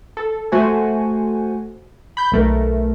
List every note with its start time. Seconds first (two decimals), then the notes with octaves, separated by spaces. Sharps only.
0.17 A4
0.52 A3 F#4 C5 G#5
2.17 B5 G6
2.32 B1 A3 A#4